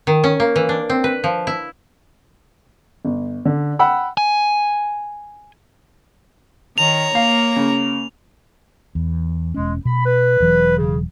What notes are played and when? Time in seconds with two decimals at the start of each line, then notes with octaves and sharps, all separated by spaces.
0.07 D#3
0.24 C#4
0.40 A#3
0.56 E3
0.69 D4
0.90 C4
1.04 B4
1.24 F3
1.47 E4
3.05 G1
3.45 D3
3.79 F#5 G5 B5 E6
4.17 G#5
6.78 D#3 C#5 A#5 F7
7.15 A#3 F5
7.56 C#3
8.95 E2
9.54 E1 G#3 C#4
9.85 B2 B5
10.06 B4
10.40 E1 E3 F#3
10.77 C#3